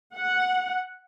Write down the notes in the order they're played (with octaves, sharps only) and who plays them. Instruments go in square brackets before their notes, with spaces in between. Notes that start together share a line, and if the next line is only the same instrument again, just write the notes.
[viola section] F#5